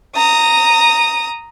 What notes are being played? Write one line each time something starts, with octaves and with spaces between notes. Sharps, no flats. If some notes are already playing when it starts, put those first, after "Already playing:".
A#5 D#6